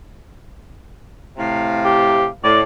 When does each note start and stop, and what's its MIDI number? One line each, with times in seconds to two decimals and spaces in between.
1.37 2.30 45
1.37 2.30 48
1.37 2.30 77
1.85 2.27 67
2.44 2.63 45
2.44 2.61 74